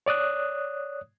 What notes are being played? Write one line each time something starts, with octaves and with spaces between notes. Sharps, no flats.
C#5 D5 D#6 F#6